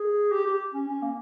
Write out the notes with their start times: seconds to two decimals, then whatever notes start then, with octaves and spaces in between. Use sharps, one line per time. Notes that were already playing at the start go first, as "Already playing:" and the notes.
Already playing: G#4
0.32 G4
0.46 G4
0.74 C#4
0.88 C#4
1.02 A#3